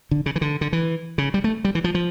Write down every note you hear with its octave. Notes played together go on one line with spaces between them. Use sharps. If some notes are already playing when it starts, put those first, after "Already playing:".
D3
C#3
E3
D3
D3
E3
C#3
G3
A3
G3
E3
F3
F3